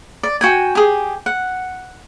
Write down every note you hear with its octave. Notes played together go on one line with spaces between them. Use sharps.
D5
F#4 G5 G#5
G4 G#4
F#5